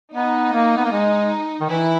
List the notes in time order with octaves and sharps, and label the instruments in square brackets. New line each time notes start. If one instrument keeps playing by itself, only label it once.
[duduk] B3 [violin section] D#4
[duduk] A#3
B3
A#3
G#3
D#3
[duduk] E3 [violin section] E4